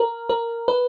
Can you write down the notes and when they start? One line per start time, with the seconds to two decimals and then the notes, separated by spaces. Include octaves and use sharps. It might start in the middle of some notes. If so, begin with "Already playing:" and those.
Already playing: A#4
0.29 A#4
0.68 B4